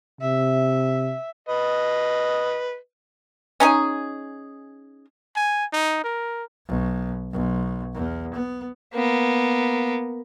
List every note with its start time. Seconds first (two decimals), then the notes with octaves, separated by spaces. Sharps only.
0.21 C3 E5
1.49 B4 D#5
3.60 C#4 D#4 G#4
5.36 G#5
5.73 D#4
6.04 A#4
6.67 B1
7.32 B1
7.94 E2
8.34 B3
8.94 A#3 B3